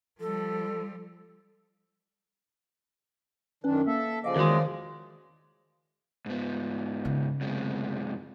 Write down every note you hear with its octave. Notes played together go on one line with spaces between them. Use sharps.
F3 G3 A4
F#2 D#3 C#4 D4 B4
A#3 A4 E5
C#3 F3 D5 D#5 F5 G#5
E2 D#3 G#3 F#4
G#2 B3
C#3
F#2 C3 G#3